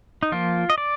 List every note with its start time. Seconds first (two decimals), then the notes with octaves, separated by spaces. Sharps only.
0.23 D#4
0.32 F3 A#3 F4
0.70 D#5
0.78 D5